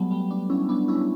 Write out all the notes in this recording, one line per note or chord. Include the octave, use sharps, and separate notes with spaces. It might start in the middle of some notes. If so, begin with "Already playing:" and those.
Already playing: F#3 G3 A3 B3
G3 B3
B3 D4
C#4 E4
B3 D4
C#4 E4